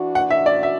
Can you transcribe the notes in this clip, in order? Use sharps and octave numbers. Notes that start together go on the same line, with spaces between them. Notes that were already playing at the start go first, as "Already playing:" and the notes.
Already playing: E3 D4 F#4
F#5
E5
D5
E5